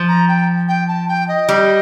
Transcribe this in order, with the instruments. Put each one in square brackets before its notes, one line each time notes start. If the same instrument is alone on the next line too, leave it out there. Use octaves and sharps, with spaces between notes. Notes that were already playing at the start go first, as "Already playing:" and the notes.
Already playing: [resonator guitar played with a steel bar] F3
[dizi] A#5
G5
G5
A5
G5
D#5
[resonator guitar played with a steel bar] G3